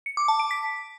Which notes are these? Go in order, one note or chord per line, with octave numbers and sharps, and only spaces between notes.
C#7
D6
A5
D7
B6